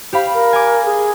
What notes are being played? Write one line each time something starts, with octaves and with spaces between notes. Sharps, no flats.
G4 C5 F5 B5
A#4
G#5 D6
G#4